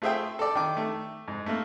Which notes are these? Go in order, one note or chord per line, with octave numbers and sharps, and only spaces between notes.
A3 F4 G#4 C5 E5 G5
A4 D5
D#3 D6
A3
G#2
A3 A#3